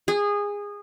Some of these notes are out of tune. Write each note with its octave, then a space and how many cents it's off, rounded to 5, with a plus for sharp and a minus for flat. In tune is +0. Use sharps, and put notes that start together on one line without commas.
G#4 -20